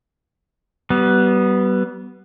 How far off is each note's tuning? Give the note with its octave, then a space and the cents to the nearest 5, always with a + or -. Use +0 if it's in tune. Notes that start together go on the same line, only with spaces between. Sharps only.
G3 -30 B3 +0